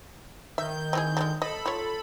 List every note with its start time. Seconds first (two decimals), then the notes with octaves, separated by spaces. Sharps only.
0.58 D#3 E5 G6
0.93 C4 E4 G#4
1.17 D3 F#3 G#3
1.42 A4 D#5 B5
1.66 F4 C#5